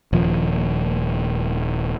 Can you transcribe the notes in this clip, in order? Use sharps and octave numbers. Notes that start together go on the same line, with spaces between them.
D#1 F3